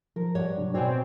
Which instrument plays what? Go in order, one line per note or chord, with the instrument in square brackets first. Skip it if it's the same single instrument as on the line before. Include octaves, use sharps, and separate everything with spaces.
[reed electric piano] F3 [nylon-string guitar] A#4
[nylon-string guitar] G2 C#5 F#5
[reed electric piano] C3 F#3 D4
[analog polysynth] B2 C4 [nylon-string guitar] F#4 C#5 [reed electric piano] D5 G#5